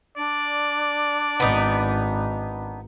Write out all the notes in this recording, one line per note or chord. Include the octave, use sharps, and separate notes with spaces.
D4 D5
G#1 B3 D#4